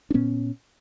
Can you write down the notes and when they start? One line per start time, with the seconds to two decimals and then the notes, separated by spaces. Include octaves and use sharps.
0.10 D4
0.14 A#2 B3 C#4